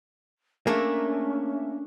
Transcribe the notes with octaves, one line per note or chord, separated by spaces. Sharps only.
A3 A#3 C#4 D4 G#4 A#4 E5